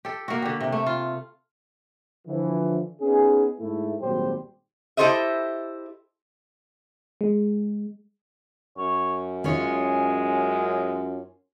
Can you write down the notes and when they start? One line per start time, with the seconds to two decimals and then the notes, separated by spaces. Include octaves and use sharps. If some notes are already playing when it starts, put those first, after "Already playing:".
0.05 G4 A4
0.28 A#3 F#4
0.42 D3 G4
0.60 C3
0.72 A3
0.87 F4
2.26 D3 E3 F3
3.00 B3 C#4 D#4 G#4
3.59 G#2 A3 E4
4.01 G#1 A#2 F#3 G3 G4 C5
4.97 E4 G4 A4 C5 D#5 E5
7.21 G#3
8.78 F#2 C#5
9.44 G#3 C#4 F4 C#5